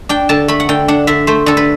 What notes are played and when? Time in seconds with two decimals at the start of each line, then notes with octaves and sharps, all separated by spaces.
0.09 D4 G5
0.29 D3 A5
0.48 A3 B5
0.60 F#5
0.69 D3 G5
0.88 D4 F#5
1.07 D3 E5
1.27 A3 C5
1.46 D3 A4
1.57 B4